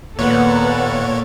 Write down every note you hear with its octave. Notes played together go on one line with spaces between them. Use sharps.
D#2 A#2 A#3 B3 A4 C#5 F#5